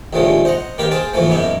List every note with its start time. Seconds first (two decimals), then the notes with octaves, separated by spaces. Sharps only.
0.13 A#1 D#2 A2 F3 G3 G#3
0.45 C5 D#5 F#5 A#5
0.78 D#3 A#3 G4 A#4 B4
0.91 G#4 C5 F5 G5 A5
1.13 E2 G#2 E3 F3 A3 A#3
1.30 F#2 B2 A#3 B3 D#4 E4